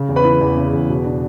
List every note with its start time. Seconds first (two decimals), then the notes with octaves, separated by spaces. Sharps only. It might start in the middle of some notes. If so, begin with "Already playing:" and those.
Already playing: C#3
0.09 E2
0.16 B4 B5
0.25 E3
0.41 E2
0.57 C#3
0.73 E2
0.89 B2
1.05 D4